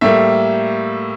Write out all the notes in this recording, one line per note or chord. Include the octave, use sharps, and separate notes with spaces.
A2 G3 A#3 E5